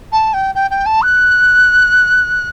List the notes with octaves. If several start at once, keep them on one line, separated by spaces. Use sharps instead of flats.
A5
G5
G5
G5
A5
F#6